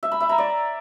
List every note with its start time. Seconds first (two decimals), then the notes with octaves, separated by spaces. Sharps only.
0.03 E5
0.12 B5
0.20 E5
0.29 A#5
0.38 D5